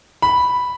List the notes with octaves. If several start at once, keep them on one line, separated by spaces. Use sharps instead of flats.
B5